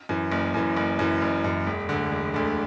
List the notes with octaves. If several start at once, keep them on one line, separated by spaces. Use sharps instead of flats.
F#2 E3
F#1
F#2 E3
F#1
F#2 E3
F#1
F#2 E3
E1
D2 D3
E1
D2 D3